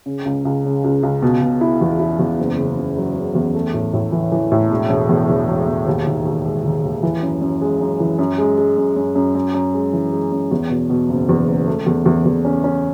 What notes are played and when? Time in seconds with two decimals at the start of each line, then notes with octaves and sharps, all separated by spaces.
0.06 C#3
0.25 C#2
0.45 C#2
0.65 C#3
0.84 C#2
1.03 C#2
1.22 B2
1.41 B2
1.61 E4
1.81 E2
1.99 E4
2.19 E2
2.38 F#1
2.58 C#3
2.77 F#1
2.97 F#3
3.15 C#3
3.35 E2
3.54 A3
3.74 A2
3.93 A2
4.12 E3
4.32 E3
4.52 A2
4.71 E1
4.89 E1
5.09 E2
5.29 E2
5.48 E1
5.67 E1
5.87 D#2
6.07 D#3
6.25 D#2
6.45 G#3
6.64 D#3
6.83 D#2
7.03 E3
7.22 F#2
7.41 F#2
7.61 G#3
7.81 F#2
8.00 E3
8.19 F#2
8.38 G#3
8.58 G#3
8.78 F#2
8.96 F#2
9.15 F#2
9.35 F#2
9.54 F#2
9.74 G#3
9.93 E3
10.12 G#3
10.32 F#2
10.51 E2
10.70 B2
10.90 B2
11.09 F#1
11.29 E2
11.48 F#1
11.67 A3
11.86 E2
12.06 E2
12.25 E2
12.45 C#4
12.64 C#4